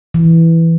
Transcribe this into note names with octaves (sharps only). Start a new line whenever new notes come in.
E3